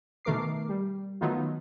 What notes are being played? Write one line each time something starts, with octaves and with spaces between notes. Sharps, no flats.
B2 D#3 A3 A#4 D6 C7
G3
D#3 F#3 A3 B3 D#4 F4